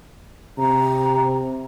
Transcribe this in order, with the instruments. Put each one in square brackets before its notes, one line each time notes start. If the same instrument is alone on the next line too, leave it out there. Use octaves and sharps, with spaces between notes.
[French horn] C3 [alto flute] A#5